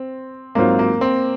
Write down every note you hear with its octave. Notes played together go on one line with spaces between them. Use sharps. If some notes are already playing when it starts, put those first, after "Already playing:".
Already playing: C4
G#2 F#3 A#3 C4 F4
A#3
C4